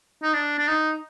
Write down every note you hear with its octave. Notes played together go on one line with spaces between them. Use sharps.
D#4
D4
D4
D#4